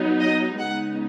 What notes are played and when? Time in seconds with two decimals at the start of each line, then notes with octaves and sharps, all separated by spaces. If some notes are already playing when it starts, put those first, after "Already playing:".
Already playing: F#3 B3 D#4
0.20 D#5
0.59 C#3 G#3 B3 D#4 F#5